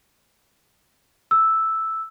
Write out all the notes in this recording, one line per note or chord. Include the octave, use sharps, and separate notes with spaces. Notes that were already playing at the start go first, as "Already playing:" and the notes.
E6